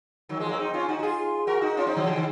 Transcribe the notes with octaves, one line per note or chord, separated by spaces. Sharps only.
D#3 F#3
F3 G#3
F#3 A#3
C4 D#4
C#4 F4
D#4 F#4
F#4
F4 G#4
F#4 A#4
D#4 F#4
C#4 F4
C4 D#4
D#3 F#3
C#3 F3
D#3